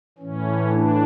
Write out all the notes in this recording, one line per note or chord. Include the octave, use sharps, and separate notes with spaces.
A2 E3 C#4
D4